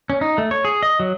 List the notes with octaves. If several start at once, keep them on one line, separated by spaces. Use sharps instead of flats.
C#4
D#4
A3
C#5
G#4
D#5
F#3